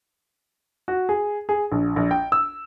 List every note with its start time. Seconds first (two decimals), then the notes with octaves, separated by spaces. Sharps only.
0.88 F#4
1.09 G#4
1.49 G#4
1.72 A#1
1.96 A#1
2.11 G5
2.32 E6